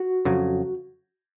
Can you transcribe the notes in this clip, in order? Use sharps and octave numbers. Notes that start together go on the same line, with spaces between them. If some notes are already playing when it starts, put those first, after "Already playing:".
Already playing: F#4
F2 C#3 F#3